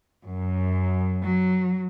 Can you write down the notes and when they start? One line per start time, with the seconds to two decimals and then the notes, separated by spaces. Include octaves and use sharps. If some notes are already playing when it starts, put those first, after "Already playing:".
0.24 F#2
1.22 F#3